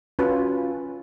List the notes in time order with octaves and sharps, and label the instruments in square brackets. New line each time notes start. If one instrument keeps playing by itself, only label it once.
[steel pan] C#4 F#4 B4 [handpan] F4